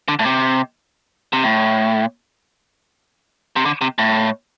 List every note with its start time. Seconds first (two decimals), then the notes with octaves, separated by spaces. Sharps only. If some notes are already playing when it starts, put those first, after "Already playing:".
0.08 D3
0.19 A2
0.25 C3
1.33 C3
1.44 A2
3.56 C3
3.65 D3
3.81 C3
3.99 A2